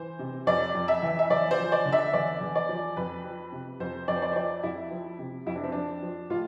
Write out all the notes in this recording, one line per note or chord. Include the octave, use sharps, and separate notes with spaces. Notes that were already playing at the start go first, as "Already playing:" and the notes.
Already playing: E3 C5
C3
F2 D5
F2
E5
E3
E5
E2 D5
C5
F3
D5
D3
E5
E2 D5
E2
D5
F3
F2 B4
F3
C3
F2 C5
F2 D5
C5
D5
C5
F3 D5
F2 E4
F3
C3
F2 E4
D4
C4
F2 D4
F3
A2 F4